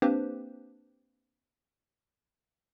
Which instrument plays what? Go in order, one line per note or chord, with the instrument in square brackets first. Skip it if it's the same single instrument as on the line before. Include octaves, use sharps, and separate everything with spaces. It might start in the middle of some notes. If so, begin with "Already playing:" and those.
[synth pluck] A#3 C4 D4 G4 B4 C5